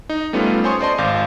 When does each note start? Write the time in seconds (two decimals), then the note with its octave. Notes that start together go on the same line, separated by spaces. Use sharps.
0.09 D#4
0.33 G3 A3 B3 C#4 D#4 F4
0.64 C5 C#5 G#5 C6 C#6 D#6
0.81 C5 D5 D#5 A5 C6
0.98 G#1 F5 D6 G6